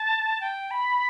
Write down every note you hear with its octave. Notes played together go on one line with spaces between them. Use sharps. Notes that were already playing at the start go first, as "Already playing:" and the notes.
Already playing: A5
G5
B5